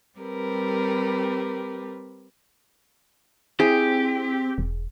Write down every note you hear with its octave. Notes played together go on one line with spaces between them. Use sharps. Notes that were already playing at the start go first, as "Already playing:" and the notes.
G3 C4 G4 A#4 B4
C4 E4 G4 G#4
E1